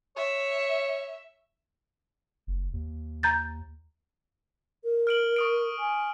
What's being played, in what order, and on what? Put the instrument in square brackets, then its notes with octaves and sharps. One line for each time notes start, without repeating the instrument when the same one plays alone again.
[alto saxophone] C#5 [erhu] E5
[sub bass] F#1
D#2
[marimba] A#5 G6 A6
[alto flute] A#4
[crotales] F6 D7 F#7
C#6 D#6 D7
[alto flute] G#5